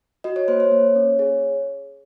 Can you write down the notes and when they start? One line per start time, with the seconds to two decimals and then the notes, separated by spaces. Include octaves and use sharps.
0.24 F#4 D#5
0.36 C#5
0.48 A#3 C5
0.60 C#5
0.72 A#3
0.95 C#4
1.19 G#4